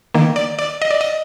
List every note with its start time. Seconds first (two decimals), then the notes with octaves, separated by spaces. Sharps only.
0.14 D#3 A#3
0.36 D5
0.59 D5
0.82 D#5
0.91 D5
1.01 D#5